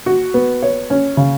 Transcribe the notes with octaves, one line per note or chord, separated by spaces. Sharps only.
F#4
B3
C#5
C#4
C#3